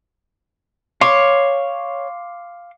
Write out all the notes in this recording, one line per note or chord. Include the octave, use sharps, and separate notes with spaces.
C#5 F5 C6 D6